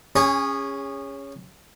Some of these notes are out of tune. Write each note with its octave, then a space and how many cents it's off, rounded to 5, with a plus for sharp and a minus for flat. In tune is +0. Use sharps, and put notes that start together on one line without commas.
C#4 +0 G#4 -30